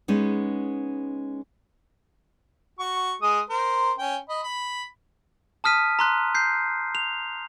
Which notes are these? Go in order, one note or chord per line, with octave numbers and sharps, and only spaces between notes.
G#3 B3 C#4 D#4
F#4 C#6
G#3 D#6
A#4 C5
C#4 G5
D#5 B5
B5
A5 D#6 F6 B6 D#7
A#5 C6 F#6
G6 C7
F7